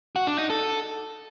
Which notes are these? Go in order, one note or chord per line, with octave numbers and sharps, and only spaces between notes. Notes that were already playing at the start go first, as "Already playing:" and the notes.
F#4
D4
D#4
A4